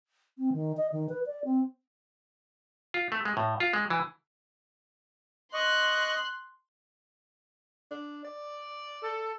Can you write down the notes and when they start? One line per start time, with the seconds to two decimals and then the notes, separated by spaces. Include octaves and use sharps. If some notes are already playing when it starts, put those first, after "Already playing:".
0.38 C4
0.53 D#3
0.77 D#5
0.92 D#3
1.09 B4
1.26 D5
1.45 C4
2.94 F4
3.12 A3
3.25 G#3
3.37 A2
3.60 F4
3.73 G#3
3.90 E3
5.54 D#5 C6 C#6 F#6
7.91 D4
8.25 D5
9.02 A4